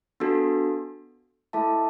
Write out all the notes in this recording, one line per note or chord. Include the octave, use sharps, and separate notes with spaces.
B3 D4 F#4 A4
A3 E4 A4 E5 A5